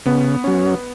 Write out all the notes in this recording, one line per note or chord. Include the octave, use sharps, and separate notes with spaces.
C#3 B3
F#3 C#4